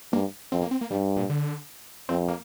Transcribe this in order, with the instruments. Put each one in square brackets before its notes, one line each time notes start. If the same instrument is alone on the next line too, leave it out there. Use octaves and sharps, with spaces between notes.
[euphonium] G2 [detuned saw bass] A#3
[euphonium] F2 [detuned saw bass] C4
[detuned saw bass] A#3
C4
A#3
[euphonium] G2 [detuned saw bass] G3
[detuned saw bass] A#2
D3
[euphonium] F2 [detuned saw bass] C4
[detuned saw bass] A#3